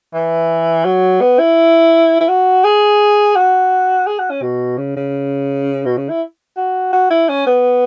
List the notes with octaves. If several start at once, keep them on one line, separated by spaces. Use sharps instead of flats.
E3
F#3
B3
E4
E4
F#4
G#4
F#4
G#4
F#4
C#4
B2
C#3
C#3
B2
C#3
E4
F#4
F#4
E4
C#4
B3